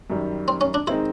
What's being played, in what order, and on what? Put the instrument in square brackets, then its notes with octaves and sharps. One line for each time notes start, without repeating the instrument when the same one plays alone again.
[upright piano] F#2 D#3 G3
[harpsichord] C4
C#4
D4
[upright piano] D#3 G#3 C4 D#4 [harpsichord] E4